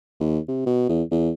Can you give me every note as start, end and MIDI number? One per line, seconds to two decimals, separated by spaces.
0.20 0.39 39
0.48 0.65 48
0.66 0.86 47
0.89 1.03 40
1.11 1.30 40